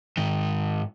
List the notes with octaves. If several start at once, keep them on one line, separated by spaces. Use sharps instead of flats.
G#2 D#3